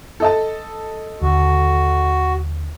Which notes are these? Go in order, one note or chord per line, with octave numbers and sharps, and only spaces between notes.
A4 D#5 A5
D#2 D3 F#4